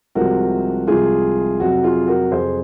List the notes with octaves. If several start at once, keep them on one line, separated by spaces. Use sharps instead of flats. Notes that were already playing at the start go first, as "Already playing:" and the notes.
C2 C3 F3 G#3 F#4 A#4
C2 C3 F3 G#3 F4 G#4
F2 C3 F#3 F#4
F4 G#4
F#4 A#4
F2 C3 F#3 G#4 C5